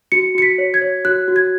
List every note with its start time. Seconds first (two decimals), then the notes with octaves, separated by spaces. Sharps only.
0.12 F#4 C#7
0.35 F#4 C#7
0.42 B6
0.58 C#5
0.74 G#6
0.82 C#5
1.05 F#4 F#6
1.28 F#4
1.36 G#6